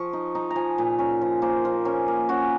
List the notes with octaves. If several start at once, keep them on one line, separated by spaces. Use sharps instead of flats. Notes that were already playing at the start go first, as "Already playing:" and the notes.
Already playing: F3 C#6
D#4
D#4 A#5
A#5
F3 G#5
A#2
C#4 A#4
F3
A#3 C5
F3
C#4 A#4
A#3
C#4 F#4